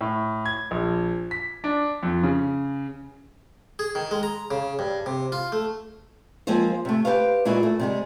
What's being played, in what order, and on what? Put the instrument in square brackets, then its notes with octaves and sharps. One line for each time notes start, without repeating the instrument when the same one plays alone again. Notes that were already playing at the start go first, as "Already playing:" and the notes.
[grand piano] A2
G#6
A#1
B6
D4
F2
C#3
[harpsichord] G#4
D#3
G#3
A#5
C#3
G2
C3
F4
A3
[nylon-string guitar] F3 G#3 A#3 C4 F4 C5
C3 A3
G4 A4 B4 C5 F5
A#2 G#3 A#3 E4 F#4
A3
C3 G3 G#3